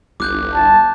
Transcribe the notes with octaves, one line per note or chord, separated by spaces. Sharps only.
G1 C2 D6 F#6 G6
A5